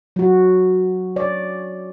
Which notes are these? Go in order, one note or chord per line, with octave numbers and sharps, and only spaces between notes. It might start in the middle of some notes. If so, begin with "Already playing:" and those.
F#3 F#4
C#5 D5